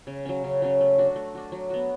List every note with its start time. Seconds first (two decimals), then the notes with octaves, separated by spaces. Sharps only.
0.07 C#3
0.25 F#3 C#4
0.44 C#3
0.62 F#3 C#4
0.81 A3
0.98 D4 F#4
1.16 A3
1.35 D4 F#4
1.52 F#3
1.70 B3 F#4